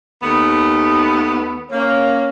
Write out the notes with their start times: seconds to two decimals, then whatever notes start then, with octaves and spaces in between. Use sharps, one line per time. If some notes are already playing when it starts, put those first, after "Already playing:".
0.23 D#2 A3 B3
1.72 A#3 C#4